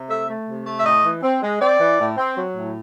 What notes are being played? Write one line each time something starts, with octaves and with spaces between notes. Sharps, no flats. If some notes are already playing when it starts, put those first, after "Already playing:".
Already playing: C3
A3 E5
A3
C3
A3
E5
A2 D#5
E3
C4
G#3
C4 D5
E3
A2
C4
F#3
A2